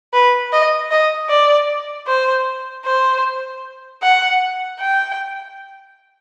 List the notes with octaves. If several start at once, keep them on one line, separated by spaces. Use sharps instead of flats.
B4
D#5
D#5
D5
C5
C5
F#5
G5